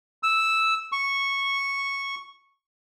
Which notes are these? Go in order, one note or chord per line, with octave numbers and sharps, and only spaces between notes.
E6
C#6